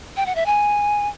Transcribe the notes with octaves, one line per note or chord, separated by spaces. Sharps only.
G5
F#5
E5
G#5